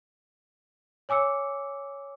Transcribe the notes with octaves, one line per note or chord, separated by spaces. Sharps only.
C#5 G#5 D6 E6 C#7